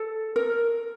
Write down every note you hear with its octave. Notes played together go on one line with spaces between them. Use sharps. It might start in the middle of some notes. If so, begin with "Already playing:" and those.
Already playing: A4
A#4